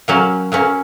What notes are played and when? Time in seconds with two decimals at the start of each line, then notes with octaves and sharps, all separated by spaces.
0.08 F#3 A#3 C#4
0.52 F#3 A#3 C#4